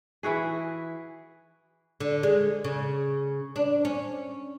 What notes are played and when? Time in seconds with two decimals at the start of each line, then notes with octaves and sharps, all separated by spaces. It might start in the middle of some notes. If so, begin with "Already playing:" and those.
0.23 E3 E4 F#4 G#4
2.00 D3
2.23 G#3
2.64 C#3
3.56 D4
3.85 C#4